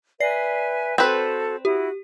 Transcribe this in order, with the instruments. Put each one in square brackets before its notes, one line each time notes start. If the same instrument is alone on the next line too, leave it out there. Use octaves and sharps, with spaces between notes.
[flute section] B4 E5 G#5 [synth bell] D5 C7
[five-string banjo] C4 B4 [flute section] F#4 A4 C5
[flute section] E4 F#4 [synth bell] G4